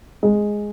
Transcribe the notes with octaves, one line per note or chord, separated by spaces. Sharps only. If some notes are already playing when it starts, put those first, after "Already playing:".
G#3